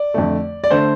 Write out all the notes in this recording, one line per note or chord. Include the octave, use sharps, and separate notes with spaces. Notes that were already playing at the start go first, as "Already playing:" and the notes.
Already playing: D5
F2 D3 A3
D5
D3 A3 C5